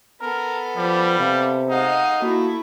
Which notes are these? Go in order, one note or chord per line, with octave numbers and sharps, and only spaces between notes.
B3 A4 A#4
F3 G3
C3 F5
G#3 D#4 F5 F#5
A3 A#3 E4 F#4